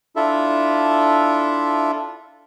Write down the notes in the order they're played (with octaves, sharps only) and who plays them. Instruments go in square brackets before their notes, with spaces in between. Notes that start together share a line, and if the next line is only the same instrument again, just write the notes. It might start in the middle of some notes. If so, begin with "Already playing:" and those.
[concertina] D4 E4 F4 A4 E5